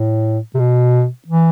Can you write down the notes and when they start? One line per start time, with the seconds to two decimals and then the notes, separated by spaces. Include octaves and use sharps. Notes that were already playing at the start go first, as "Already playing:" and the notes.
Already playing: A2
0.55 C3
0.59 B2
1.28 E3